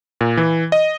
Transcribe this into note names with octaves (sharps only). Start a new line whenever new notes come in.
A#2
E3
D#5